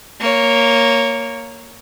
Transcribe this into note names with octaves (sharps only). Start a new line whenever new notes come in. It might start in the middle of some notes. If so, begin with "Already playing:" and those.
A#3 C#5